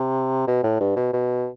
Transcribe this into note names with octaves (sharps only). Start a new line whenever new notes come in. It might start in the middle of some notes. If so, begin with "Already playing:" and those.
Already playing: C3
B2
A2
G2
B2
B2